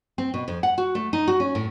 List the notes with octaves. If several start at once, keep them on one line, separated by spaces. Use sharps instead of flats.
C4
B2
F2
F#5
F#4
A3
D#4
F#4
C#4
A2